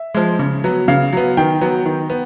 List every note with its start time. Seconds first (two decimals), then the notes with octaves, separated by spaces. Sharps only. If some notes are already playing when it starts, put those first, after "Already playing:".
Already playing: E5
0.14 F3 G#3
0.39 C#3
0.64 F#3 B3
0.88 C#3 F5
1.13 F#3 B3
1.37 D#3 G5
1.61 F#3 B3
1.85 D#3
2.10 B3